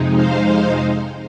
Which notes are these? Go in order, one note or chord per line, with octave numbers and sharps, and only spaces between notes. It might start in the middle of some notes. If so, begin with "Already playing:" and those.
Already playing: F2 C3 G#3 D#4
C5 F5